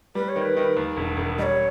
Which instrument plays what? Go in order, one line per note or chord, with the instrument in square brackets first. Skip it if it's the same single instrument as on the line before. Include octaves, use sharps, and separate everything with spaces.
[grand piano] G3 [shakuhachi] B4
[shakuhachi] C#5
[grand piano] D#3
[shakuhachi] B4
[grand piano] D#3
D#2
E1
E1
[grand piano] G3 [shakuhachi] D#5
[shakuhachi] C#5